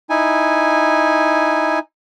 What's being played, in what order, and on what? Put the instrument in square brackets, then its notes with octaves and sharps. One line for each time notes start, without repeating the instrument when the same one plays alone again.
[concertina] D#4 E4 G#5